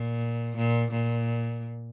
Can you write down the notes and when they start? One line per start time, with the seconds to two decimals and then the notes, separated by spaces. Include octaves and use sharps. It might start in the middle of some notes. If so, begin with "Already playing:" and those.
Already playing: A#2
0.57 A#2
0.92 A#2